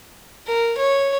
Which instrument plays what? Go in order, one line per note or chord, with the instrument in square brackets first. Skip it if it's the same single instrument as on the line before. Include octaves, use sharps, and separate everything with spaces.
[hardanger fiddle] A#4
C#5